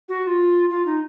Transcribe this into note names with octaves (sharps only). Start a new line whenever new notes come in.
F#4
F#4
F4
F4
D#4